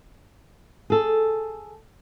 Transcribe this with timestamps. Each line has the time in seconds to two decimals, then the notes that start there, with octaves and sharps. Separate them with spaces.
0.90 G#4 A4